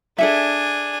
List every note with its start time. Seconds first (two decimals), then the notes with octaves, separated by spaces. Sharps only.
0.18 D4 G#4 A4 E5 G#5